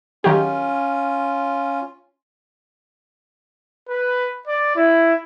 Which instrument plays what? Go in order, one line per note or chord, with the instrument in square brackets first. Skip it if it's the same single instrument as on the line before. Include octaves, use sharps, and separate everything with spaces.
[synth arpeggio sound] D#3 F#3 G4 [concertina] C#4 F4
[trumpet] B4
D5
E4